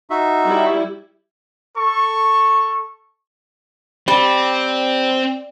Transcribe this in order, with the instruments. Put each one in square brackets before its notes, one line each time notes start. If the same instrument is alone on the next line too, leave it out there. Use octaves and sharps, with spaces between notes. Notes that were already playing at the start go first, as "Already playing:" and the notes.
[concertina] D#4 F#4 E5
[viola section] G3 E4
[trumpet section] A4 C#6
[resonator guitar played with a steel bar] G3 [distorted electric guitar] C4